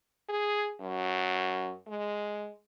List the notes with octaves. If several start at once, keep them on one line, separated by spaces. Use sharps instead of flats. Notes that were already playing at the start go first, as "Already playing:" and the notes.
G#4
F#2
G#3